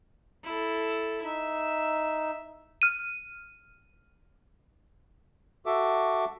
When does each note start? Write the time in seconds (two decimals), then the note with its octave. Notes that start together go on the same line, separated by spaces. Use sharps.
0.44 E4 A4
1.23 D#4 E5
2.82 F6 D#7
5.66 F#4 A4 E5 D6